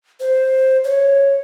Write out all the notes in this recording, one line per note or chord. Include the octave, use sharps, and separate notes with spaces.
C5
C#5